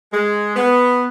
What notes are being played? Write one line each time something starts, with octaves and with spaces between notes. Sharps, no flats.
G#3
B3